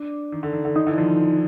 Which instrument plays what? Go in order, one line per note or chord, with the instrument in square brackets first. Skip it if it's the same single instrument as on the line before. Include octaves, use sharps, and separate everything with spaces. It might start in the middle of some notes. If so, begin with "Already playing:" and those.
Already playing: [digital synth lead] D4
[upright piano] D#3
D3
D#3
D3
[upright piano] D#3 [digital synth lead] D#4
[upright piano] D3 E3
D#3 F3